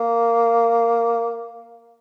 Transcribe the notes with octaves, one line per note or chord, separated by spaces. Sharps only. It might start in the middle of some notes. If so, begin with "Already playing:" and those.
Already playing: A#3